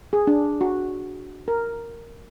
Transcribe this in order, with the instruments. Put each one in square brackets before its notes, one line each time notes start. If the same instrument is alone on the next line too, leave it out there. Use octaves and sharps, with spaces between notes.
[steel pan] G#4
D4
F#4
A#4